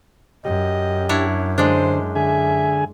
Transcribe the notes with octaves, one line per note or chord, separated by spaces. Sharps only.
F#2 G4 D#5
D4 E4 C#5
D3 G#3 D4 C5
D3 G#4 E5 G#5